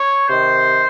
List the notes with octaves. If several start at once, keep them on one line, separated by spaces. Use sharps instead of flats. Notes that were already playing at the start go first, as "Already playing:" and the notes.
Already playing: C#5
C3 D#3 C5